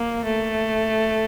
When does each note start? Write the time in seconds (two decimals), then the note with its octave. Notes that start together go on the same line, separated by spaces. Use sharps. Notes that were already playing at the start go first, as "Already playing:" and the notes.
Already playing: A#3
0.25 A3